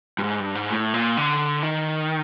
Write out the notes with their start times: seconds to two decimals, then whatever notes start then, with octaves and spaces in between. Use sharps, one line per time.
0.19 G2
0.24 G#2
0.40 G2
0.55 G#2
0.71 A2
0.94 A#2
1.17 D3
1.63 D#3